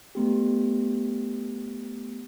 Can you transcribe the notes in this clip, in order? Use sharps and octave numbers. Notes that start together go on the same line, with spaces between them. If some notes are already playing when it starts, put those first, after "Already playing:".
A3 B3 G4